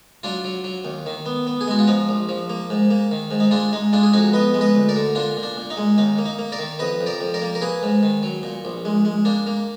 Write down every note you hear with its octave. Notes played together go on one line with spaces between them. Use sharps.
F#3 D4 F4
F#3
F#3
D#2
D#3
B3
B3
G#4
G#3 F#4
F4
F3 D#4
A#1
F3
A#3
G#2
A#3
D#3
G#2
D#4
G#3 D4 F4
G#3 D#4
G#3 D4 F4
G#4
F2 D#4 F#4
B3 B4 D#5
G#3
B4 D#5
D2
A#4 D5
D3
A#2 D4 F4
A#2
D4
A#2
D#4
G#3
D#2 D#4
A#3
D#4
A#3
A#4 D5
D#3
F2 B4 D#5
F2
A#4 D5
F2
A#4 D5
A#3
A#4
A#3 G#4 B4
G#2
D#3
F#3
A#2
A#1
G#3
G#3
A#3 D4
A#3